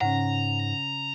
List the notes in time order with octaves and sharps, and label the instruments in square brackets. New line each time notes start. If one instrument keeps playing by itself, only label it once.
[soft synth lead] G#2 [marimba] C#3 C#4 [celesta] F#5 [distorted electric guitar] A#5